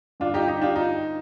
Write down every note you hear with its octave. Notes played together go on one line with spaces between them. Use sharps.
G2 D3 D4 F4
D#4 G4
D#4 G4
D4 F4
D#4